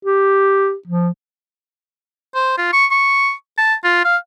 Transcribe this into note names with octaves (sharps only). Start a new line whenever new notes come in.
G4
F3
C5
F4
C#6
C#6
A5
F4
F5